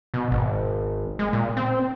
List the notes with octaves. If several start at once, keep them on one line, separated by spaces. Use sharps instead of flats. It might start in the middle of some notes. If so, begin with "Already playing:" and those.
B2
G#1
G#3
A#2
C4